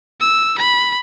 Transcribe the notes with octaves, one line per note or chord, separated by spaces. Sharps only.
E6
B5